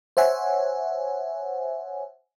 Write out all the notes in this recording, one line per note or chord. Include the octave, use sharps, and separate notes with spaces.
C5 C#5 E5 F#5 G#5